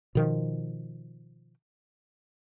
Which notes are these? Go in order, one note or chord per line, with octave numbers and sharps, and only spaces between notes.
B2 D#3 F3